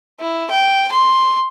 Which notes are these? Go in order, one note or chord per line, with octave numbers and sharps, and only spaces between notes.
E4
G5
C6